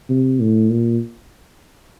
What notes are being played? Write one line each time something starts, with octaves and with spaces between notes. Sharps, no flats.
C3
A2
A#2